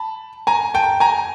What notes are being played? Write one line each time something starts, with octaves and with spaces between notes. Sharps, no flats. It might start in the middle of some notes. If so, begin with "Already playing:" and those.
Already playing: A5 B5
G#5 A#5
G5 A5
G#5 A#5